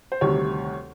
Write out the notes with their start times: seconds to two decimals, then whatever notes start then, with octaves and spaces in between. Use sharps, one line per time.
0.12 C5
0.21 D2 C3 D#3 G3 C#5